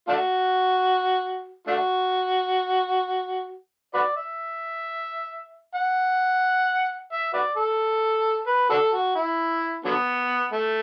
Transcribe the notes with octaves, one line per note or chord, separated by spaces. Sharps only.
A3 D4 F#4
A3 D4 F#4
F#4 B4 D5
E5
F#5
E5
F#4 B4 D5
A4
B4
D4 F#4 A4
F#4
E4
D3 F#3 B3
A3